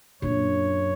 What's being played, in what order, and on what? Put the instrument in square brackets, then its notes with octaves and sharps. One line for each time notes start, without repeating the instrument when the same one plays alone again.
[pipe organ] F#2 C#5 [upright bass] A#2 D4